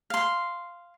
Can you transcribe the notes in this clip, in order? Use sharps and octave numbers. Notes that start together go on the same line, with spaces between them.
F5 C6